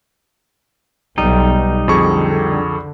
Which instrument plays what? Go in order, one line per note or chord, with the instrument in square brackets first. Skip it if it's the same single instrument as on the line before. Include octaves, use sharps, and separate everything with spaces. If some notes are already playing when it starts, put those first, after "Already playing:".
[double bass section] B1 [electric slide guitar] G3 D#4
[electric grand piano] F2 G#4 C#6 [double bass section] D3